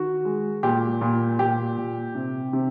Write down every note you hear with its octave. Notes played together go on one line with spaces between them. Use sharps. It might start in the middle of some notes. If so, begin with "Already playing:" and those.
Already playing: D#3 F#4
G#3
A#2 G4
A#2
A#2 G4
A#2
C3
C3